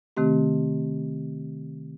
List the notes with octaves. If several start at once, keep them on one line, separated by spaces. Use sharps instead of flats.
C3 D#3 A3 C4 G4